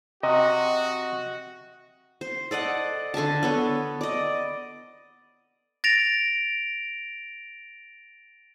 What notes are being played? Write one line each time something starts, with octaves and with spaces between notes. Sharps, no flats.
C3 F#4 D#5
C5
A4 D5 D#5 F#5
D3 A4 G#5 A5
B3 A4 C#5
D5 D#5
A6 A#6 D7 F7